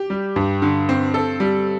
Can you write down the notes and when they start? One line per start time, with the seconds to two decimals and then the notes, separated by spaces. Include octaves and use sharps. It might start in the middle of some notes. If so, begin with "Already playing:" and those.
Already playing: G4
0.10 G3
0.36 G2
0.62 D3
0.89 C4
1.14 A4
1.40 G3